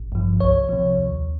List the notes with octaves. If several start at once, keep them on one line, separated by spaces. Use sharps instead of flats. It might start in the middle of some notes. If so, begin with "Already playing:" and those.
Already playing: G#1
G2 F3
C2 C#5
C3 F3
D#2